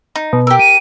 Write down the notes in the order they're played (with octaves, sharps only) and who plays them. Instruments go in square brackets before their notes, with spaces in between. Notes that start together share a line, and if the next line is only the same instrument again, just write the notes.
[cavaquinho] D#4
[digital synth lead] B2
[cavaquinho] G4 A#4 [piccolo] E6
[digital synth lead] D7 [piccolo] D#7